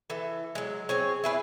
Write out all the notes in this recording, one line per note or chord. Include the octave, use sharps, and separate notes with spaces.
E3 A4
F#3 G#3
C4 G#4 C#5
E4 G#4 B4